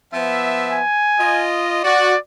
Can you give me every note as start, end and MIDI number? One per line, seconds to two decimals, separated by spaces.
0.13 0.81 53
0.13 0.81 59
0.13 0.81 76
0.72 1.46 80
1.19 1.83 65
1.19 1.83 75
1.84 2.14 66
1.84 2.18 74